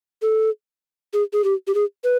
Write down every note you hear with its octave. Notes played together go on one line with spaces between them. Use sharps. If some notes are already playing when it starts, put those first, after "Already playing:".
A4
G#4
G#4
G4
G4
G#4
B4